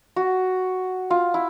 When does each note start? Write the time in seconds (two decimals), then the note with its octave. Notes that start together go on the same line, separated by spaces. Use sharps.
0.16 F#4
1.10 F4
1.34 E4